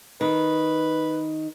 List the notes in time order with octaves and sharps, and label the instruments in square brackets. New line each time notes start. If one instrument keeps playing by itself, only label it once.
[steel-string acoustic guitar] D#3 [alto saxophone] B4